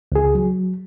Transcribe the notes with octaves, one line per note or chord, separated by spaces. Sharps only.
C#2 G#4
F#3